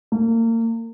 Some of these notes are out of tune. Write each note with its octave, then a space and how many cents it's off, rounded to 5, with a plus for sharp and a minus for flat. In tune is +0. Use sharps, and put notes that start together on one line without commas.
A#3 -35